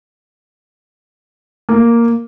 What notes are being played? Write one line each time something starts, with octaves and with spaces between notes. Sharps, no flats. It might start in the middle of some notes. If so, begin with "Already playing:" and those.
A#3